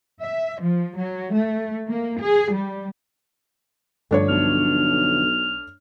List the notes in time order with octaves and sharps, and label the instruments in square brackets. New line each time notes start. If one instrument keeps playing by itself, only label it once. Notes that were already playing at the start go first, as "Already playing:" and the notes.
[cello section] E5
F3
F#3
A3
A#3
G#4
G3
[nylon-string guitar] G2 D3 F3 [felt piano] A3 D4 C#5
[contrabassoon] B1 [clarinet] F6